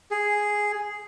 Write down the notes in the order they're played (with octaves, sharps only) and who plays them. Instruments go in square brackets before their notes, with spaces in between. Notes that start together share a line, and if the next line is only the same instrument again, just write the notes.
[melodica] G#4